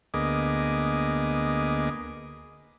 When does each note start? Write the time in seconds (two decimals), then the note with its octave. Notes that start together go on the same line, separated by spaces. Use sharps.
0.14 D2 A#3 B3 G#4 D#5 D6